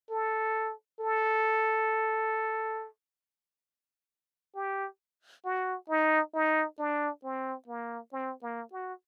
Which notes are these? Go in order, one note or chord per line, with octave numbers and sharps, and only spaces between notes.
A4
A4
G4
F#4
D#4
D#4
D4
C4
A#3
C4
A#3
F#4